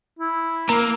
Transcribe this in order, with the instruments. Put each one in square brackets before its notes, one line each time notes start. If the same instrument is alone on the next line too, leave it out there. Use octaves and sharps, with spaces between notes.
[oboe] E4
[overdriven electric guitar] A#3 [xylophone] A#5